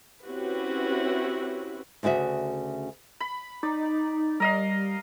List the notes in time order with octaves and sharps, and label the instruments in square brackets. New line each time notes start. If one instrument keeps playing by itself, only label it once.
[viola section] C4 C#4 E4 F#4 G4 B4
[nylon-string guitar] D2 C#3 E4 F#4 E5
[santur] B5
[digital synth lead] D#4 [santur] D5
[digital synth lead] G3 [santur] A#4 D#5 F5